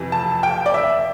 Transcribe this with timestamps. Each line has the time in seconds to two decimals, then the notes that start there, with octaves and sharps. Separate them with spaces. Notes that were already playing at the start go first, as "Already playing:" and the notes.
Already playing: F2 C3 E3
0.12 A5
0.43 G5
0.66 D5
0.74 E5